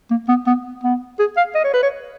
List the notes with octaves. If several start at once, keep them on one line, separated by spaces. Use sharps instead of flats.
A#3
B3
B3
B3
G#4
F5
D#5
C#5
B4
C#5